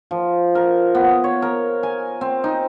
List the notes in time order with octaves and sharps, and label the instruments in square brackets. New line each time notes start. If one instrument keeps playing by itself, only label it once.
[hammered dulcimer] F3
A#4
B3
C#5
A#4
G#5
C4
D#4